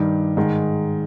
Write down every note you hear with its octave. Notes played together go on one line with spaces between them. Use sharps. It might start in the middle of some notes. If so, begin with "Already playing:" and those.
Already playing: G2 D#3 G3
G#2 D#3 G#3